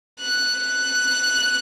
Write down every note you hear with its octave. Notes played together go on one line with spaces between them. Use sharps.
F#6
F#6